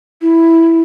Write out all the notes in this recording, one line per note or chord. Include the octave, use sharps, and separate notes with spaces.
E4